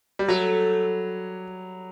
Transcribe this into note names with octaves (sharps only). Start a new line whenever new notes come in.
G3
F#3 A3